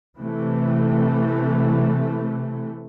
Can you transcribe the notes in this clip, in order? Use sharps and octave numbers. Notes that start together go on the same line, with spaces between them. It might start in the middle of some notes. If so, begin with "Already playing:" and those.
C3 E3 A3